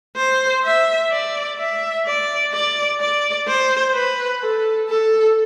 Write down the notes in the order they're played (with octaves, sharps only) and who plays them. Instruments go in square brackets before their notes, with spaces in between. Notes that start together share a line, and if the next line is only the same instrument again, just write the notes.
[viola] C5
E5
D5
E5
D5
D5
D5
C5
B4
A4
A4